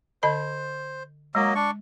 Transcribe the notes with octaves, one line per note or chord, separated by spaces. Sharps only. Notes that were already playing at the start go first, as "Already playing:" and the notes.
D3 C5 D#5 B5
F#3 G#3 A#3 D#5
D4 C#6